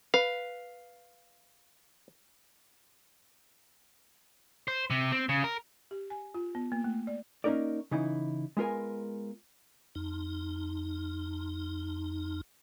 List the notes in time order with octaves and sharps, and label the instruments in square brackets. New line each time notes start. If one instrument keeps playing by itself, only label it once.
[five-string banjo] B4 [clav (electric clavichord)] F5
[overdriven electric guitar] C5
C3
C4
C#3
A#4
[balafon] G4
G#5
F4
B3
A#3
A3
D5
[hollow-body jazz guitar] A#3 C#4 D#4 A#4 D5
C#3 E3 D#4 E4
G#3 B3 F4 A#4 G#5
[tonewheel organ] F2 D#4